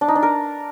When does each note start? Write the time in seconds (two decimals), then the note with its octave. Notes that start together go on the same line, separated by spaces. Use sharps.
0.01 D4
0.08 D#4
0.15 D4
0.23 A#4